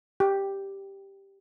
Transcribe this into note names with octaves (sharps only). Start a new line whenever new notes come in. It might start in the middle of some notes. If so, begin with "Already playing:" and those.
G4